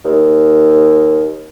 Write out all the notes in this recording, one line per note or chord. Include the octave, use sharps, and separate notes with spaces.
D#2